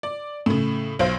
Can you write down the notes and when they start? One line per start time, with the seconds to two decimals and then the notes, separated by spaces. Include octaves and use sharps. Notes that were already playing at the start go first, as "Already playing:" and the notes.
0.03 D5
0.46 A2 C#3
0.99 B1 C5 F5